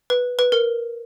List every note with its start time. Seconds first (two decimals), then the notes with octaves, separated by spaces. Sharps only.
0.10 B4
0.39 B4
0.52 A#4